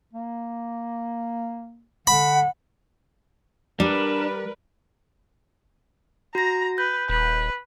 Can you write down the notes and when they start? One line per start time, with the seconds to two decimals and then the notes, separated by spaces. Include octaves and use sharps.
0.13 A#3
2.07 D3 F#5 B5
3.80 G3 D4 A#4 B4
6.35 F#4 A#5 A#6
6.78 B4 G6
7.09 D#1 B4